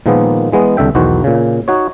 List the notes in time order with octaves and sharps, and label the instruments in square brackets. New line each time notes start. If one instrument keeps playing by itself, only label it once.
[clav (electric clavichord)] A#2 D#3 F3 G#3 A#3 B3
E3 G#3 B3
C2 D3 E5 G5
B1 E2 D#3 F#4 C5
A#2 C#3
D#4 F#4 C#5